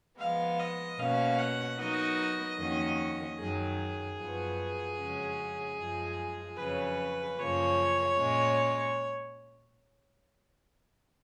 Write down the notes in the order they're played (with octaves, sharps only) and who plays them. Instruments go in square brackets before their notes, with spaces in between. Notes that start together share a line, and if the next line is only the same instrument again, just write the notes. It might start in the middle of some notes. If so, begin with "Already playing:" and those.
[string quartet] F3 G#3 B3 [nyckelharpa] F5
[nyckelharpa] D#5
[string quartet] B2 A#3 C#4 F#4 [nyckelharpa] F5
[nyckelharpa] F#5
[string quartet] F#3 B3 D#4 F#4 A#4 [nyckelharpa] D#5
[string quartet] F2 D#3 A#3 C#4 F#4
[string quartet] F#2 D#3 F#3 [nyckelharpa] G#4
[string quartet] F#2 F3 B3 F#4
F2 C#3 G#3 C#4 F#4
F#2 F3 G#3
[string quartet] F2 C#3 F#3 C#4 [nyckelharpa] B4
[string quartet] F#2 C#3 F3 A#3 C#4 [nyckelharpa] C#5
[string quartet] A#2 G#3 C#4